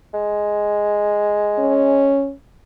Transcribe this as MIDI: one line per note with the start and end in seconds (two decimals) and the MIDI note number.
0.14 2.15 56
1.59 2.33 61